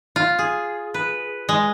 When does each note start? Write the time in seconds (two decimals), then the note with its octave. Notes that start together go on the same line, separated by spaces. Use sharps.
0.16 F4
0.39 G#4
0.94 B4
1.49 G#3